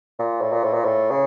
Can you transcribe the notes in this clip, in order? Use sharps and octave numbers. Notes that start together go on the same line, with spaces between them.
A#2
A2
A#2
A2
A#2
A2
C#3